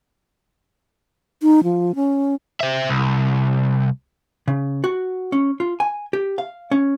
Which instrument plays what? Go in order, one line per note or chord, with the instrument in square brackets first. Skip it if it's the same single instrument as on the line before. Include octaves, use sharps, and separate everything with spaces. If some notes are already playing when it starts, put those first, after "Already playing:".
[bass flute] D#4
F3
C#4
[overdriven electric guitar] C5 E5
C2
[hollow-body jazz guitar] C#3
F#4
C#4
F4
G#5
G4
F5
C#4